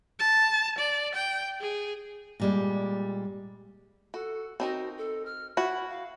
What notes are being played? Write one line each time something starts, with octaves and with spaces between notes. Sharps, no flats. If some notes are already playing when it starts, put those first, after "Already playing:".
A5
D5
G5
G#4
A#2 G3 G#3
F#4 A4
C4 D#4 F#4 A#4
A4
F6
E4 F#4 B5
F5